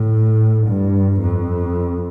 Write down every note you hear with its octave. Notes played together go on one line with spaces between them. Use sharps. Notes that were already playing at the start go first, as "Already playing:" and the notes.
Already playing: A2
G2
F2